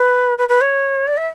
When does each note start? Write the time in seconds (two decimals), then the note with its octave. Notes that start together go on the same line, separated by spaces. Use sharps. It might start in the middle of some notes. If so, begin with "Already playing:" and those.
Already playing: B4
0.38 B4
0.49 B4
0.61 C#5
1.07 D5
1.17 E5